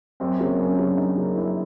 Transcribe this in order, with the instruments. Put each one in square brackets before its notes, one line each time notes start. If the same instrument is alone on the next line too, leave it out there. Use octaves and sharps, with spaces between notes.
[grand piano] F#2 C4
C#3 F#3 A#3
F#2 B3
C#4
C#3 F#3 A#3
D4
F#2 D#4
C#3 F#3 A#3
F#2 E4